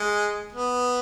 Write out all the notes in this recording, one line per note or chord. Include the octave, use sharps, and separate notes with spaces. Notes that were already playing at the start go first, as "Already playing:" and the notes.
Already playing: G#3
B3